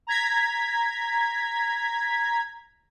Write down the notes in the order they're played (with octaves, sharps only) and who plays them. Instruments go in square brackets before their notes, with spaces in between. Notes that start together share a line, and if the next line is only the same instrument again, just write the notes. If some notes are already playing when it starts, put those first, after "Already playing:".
[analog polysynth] A#5 G#6 B6